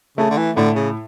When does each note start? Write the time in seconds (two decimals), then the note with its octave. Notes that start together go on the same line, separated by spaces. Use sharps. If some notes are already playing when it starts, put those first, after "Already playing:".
0.18 C#3 A3
0.30 D3
0.37 E3
0.56 A2 D3
0.76 C#3